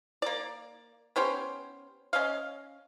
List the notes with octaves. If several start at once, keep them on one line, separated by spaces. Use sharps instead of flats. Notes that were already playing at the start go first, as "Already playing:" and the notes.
A#3 D5
B3 C#4 G4 C5
C#4 D#5 F5